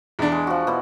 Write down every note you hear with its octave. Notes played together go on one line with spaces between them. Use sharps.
E2 D4
G#3
F3 F#4
B2 E4 D5